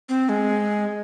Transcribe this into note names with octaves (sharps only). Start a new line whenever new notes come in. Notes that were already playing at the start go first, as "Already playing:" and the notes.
C4
G#3